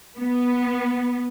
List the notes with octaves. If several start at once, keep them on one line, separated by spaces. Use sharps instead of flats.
B3